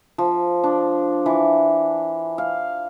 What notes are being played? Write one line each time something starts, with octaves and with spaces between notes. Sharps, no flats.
F3
D4
E3
F5